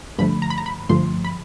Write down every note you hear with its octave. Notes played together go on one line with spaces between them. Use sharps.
G2 D3 F3 A3 B5
A#5
B5
A#5
B5
G2 D3 F3 A3 C6
B5